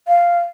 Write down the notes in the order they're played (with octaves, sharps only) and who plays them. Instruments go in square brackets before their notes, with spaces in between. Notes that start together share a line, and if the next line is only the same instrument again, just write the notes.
[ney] F5